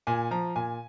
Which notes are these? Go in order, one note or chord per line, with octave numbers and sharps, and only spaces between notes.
A#2 G#5
F3 A#5
A#2 G#5